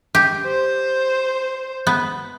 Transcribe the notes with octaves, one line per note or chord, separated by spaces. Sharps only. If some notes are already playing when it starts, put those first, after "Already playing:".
G4
C5
B3